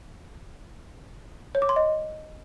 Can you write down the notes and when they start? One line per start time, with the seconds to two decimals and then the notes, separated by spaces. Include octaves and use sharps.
1.55 C#5
1.62 D6
1.69 C6
1.76 D#5